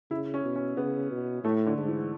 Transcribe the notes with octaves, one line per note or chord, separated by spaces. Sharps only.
C#3 E4
C#4
B2
C#4
C#3 B3
B2
A2 A3
D3
G#2
E3